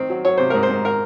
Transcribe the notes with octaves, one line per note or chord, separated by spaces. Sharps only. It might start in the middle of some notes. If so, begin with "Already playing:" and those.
Already playing: D#3 C4
F#3
F#3 C#5
C3 C5
G#2 A#4
C5
G#2
A#4